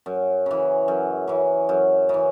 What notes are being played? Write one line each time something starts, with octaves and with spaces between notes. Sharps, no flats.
F#2
C#3 E3
F#2
C#3 E3
F#2
C#3 E3